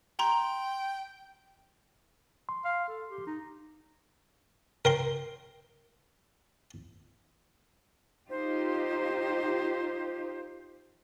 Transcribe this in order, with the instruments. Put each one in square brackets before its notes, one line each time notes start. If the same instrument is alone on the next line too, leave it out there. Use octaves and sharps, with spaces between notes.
[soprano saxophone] G5 [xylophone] A#5 C6
[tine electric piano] C6
[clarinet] F5
A4
G4
D#4
[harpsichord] A#4 G5 C6
[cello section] D#4 F4 G4 [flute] C5